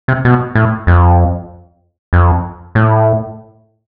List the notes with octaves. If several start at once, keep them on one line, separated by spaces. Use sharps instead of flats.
C3
B2
A2
F2
F2
A2